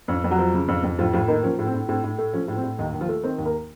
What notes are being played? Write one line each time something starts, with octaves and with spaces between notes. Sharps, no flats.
F2 C#4
F2
F#3 F#4
F3
C#3
F2
F2
A2 F3 F4
A2 F3 F4
D#3 A#3 D#4
F3 C#4
A2
C4
A2
A2 C4
A2
A3
F3 C#4
A2
C4
A2
D#2 D#3 D#4
D#2
F3 F4
A3
D#3 C4 C5
D#2
A#3 A#4